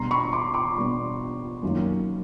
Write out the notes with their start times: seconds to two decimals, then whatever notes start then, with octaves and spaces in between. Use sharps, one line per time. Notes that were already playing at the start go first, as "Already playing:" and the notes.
Already playing: B2 G3 B3 D4 A#5 C6
0.11 B5 C#6
0.33 C6 D6
0.54 C6 D6
0.76 B2 G3 B3 D4
1.63 F#2 D#3 F#3 A#3